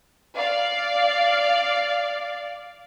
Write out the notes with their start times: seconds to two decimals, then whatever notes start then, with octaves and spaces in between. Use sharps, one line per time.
0.36 D5 F5